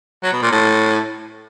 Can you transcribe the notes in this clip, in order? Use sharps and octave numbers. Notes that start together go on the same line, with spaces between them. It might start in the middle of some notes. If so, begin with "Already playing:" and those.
F#3
B2
A#2
A2